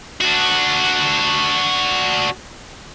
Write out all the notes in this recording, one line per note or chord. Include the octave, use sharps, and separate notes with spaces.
D4 F#4